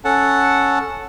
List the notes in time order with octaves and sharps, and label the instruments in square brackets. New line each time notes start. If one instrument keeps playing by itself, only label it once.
[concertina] C#4 A4 F#5 A5